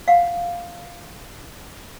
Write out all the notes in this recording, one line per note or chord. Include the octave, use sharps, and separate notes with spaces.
F5 F#5